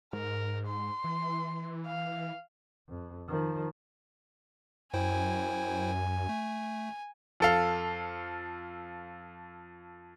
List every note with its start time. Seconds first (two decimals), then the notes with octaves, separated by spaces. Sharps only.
0.13 G#2 A#4
0.67 C6
1.04 E3
1.86 F5
2.88 F2
3.28 D#3 F3
4.93 F#2 E4 C5 G5 G#5
6.29 A3
7.40 F2 A4 F5